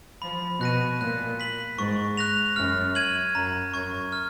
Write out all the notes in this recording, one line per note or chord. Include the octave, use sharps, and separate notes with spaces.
F3 B5
B2 F#6 A#6 D#7
A#2 F#6
B6 F#7
G#2 C#6
F#6 A#6 F7
F#2 F6
G#6 D#7 F#7
F#2 A#5
F#2 C#6 G#6
F6